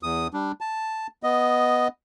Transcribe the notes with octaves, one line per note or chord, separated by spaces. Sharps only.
E2 D#6
G3 D4
A5
B3 D#5